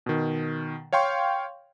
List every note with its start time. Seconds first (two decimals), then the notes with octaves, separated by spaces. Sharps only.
0.06 B2 D#3
0.93 C#5 F5 G5 C6 C#6